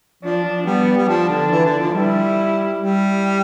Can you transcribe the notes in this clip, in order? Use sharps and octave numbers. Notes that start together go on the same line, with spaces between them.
F3 D4
F3
G3 B3
G3
F3 D4
D3
E3
D3
F3
G3 E4
G3